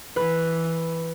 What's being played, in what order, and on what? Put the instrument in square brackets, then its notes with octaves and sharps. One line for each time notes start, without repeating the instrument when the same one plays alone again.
[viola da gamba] E3 [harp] B4